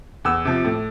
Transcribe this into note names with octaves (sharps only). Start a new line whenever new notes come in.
E2 E6
C3 F3
A2